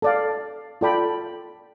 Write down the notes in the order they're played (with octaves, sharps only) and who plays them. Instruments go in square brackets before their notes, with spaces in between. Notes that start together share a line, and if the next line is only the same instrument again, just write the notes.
[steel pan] A4 D5 F5
F4 A4 D5 G5 B5